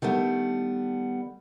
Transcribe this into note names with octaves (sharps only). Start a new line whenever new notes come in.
D#3 G3 A3 B3 D4